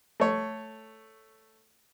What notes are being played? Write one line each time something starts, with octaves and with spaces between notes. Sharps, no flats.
A3 C#5